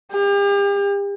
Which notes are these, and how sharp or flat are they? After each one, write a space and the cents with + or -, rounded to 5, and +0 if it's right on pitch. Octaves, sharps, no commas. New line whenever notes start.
G4 +40